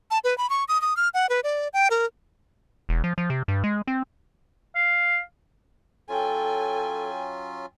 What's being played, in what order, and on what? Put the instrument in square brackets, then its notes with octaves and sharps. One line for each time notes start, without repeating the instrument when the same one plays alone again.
[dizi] A5
B4
B5
C#6
D#6
D#6
F6
F#5
B4
D5
G5
A#4
[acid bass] E1
F3
F3
C3
G2
G#3
C4
[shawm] F5
[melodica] F#3 C#4 F4 [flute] A4 [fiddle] G5 G#5